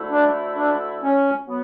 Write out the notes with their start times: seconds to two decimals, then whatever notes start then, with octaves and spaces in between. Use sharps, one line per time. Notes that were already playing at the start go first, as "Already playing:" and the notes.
Already playing: D2 D3 A3 E4
0.11 D4
0.57 D4
1.03 C#4
1.48 F#3 B3